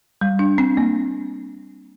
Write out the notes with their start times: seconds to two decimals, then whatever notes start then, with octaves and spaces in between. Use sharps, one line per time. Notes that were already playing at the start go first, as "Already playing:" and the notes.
0.21 G3
0.39 D4
0.58 C4
0.77 A#3